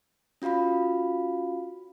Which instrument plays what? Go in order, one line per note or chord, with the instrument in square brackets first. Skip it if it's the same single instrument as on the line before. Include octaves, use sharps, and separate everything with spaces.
[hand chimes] C#4 F4 F#4 F5 B5